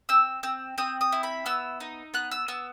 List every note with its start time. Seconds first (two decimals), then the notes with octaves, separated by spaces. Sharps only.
0.09 C4 E6
0.43 C4 E6
0.78 C4 D#6
1.01 D#6
1.12 E4
1.23 B5
1.46 B3 E6
1.80 D#4
2.14 B3 F#6
2.31 E6
2.48 B3 E6